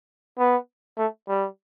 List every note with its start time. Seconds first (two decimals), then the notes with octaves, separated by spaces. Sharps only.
0.39 B3
0.98 A3
1.28 G3